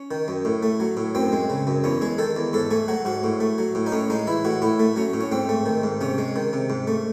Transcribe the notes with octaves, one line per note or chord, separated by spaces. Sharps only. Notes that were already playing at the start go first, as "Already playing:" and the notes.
Already playing: C#4
D#3
F#2
A2
A3
F#3
A2
F#2 C4
G#3
C#3
F#2
E2 C#4
G#3 G#4
D#3 A4
E2
G#2 A4
A3 G#4
F#3 F#4
G#2 F#4
A2
A3
F#3
A2
D#4
A2 C#4
G#3 D#4
E3 E4
A2 F#4
A2 E4
A3
F#3 C#4
A2
C#4
G#2 C4
A3
D#3
G#2
C3 C#4
G#3
D#3
C3
G#2
A3